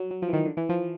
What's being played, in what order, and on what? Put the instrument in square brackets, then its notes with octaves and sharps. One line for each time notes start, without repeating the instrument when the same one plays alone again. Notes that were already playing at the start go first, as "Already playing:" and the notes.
Already playing: [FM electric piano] F#3
F#3
F3
E3
D#3
D3
E3
F3